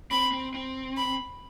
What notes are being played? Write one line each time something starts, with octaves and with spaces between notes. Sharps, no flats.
C4 B5
C4
C4
B5